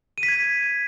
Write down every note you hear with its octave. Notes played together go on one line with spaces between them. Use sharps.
D#7
B6
G#6